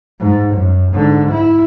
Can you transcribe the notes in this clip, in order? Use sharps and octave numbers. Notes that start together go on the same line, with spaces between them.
G#2
F#2
G#2 D3
E4